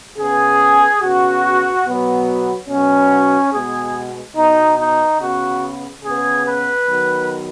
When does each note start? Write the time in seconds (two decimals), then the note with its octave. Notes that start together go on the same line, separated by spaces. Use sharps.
0.18 C#3 B3 G#4
1.01 C#3 B3 F#4
1.85 B2 F#3 B3
2.69 B2 F#3 B3 C#4
3.52 B2 G#3 B3 G#4
4.35 B2 B3 D#4
4.77 D#4
5.18 C#3 B3 F#4
6.02 C#3 B3 G#4
6.44 B4
6.86 D#3 F#3 B3